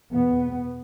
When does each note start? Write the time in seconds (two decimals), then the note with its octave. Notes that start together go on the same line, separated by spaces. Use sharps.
0.12 E2 B2 B3